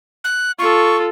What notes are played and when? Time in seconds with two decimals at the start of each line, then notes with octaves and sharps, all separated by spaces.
0.24 F#6
0.59 F4 A4 C#6